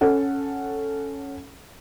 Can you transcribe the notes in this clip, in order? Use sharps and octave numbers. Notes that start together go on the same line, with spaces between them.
C#4 A4 F#5